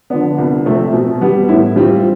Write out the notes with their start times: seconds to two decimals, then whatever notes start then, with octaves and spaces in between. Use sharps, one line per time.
0.10 D3 F3 B3 D4
0.38 C2
0.66 C3 F3 A3 C4
0.93 B2
1.21 G3 B3
1.49 A2 E4
1.76 G3 C4 F4